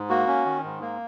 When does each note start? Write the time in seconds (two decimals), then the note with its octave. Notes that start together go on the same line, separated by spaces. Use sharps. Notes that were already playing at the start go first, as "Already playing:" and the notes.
Already playing: G#2
0.09 A#3 F#4
0.27 C#4
0.45 D#3
0.64 G#2
0.81 A#3